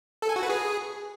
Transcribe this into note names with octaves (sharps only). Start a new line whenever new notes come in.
A4
G#5
F#4
B4
G#4